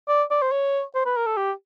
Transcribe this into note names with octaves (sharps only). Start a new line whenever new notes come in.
D5
D5
C5
C#5
C5
B4
A#4
A4
G4